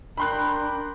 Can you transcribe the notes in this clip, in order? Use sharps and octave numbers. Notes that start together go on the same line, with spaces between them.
D4 A#4 G5 B5 C6 F#6